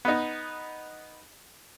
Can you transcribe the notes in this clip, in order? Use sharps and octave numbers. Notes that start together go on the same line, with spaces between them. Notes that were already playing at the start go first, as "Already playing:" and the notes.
B3 D#4